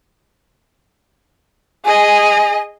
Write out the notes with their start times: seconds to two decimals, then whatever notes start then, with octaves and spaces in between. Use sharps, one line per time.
1.85 G#4 D#5 G#5